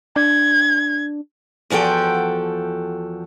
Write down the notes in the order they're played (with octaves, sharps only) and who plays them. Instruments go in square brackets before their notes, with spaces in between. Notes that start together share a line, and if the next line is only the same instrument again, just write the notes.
[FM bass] D4 [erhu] G#6
[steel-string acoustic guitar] E2 F3 F#4 A4 G5